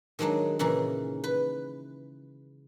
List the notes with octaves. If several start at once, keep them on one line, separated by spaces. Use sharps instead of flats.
D#3 F#3 G#3 D4 D#4
A#2 C#3 E3 D#4 G#4 A#5
B4